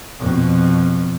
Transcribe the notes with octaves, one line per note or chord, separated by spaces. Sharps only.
F2 B2